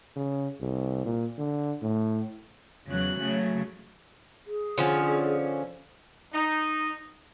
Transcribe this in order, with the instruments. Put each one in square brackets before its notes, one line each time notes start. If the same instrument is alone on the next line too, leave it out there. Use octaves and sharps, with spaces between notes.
[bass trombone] C#3
C2
A#2
D3
A2
[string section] E2 C#3 F#3 F#6
C#3 F#3 A3
[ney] G#4
[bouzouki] D3 F3 C#4
[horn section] D#4